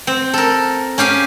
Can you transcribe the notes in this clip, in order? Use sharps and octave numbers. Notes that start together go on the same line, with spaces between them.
C4
A4 A#4
C#4 G4 F5 G#5